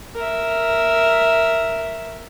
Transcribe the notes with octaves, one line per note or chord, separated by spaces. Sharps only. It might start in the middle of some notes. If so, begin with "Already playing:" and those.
A#4 E5